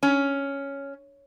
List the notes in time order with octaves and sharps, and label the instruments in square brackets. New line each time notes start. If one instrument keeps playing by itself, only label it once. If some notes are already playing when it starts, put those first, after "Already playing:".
[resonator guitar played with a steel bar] C#4